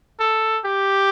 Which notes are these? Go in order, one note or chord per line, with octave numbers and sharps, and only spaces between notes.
A4
G4